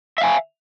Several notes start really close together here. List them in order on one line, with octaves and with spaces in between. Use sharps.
E5 F5 G#5